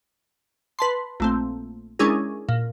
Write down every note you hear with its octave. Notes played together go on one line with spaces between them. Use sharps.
B4 A5 C6
A#1 A3 C4
G#3 C#4 D4 E4 G#4 A#4
A#2